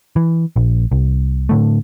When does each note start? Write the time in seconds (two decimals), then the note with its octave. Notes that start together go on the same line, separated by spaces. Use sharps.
0.16 E3
0.56 A#1
0.91 C2
1.49 A2 D3 A3